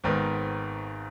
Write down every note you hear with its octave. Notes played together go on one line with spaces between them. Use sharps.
G#1 G#2 D#3 B3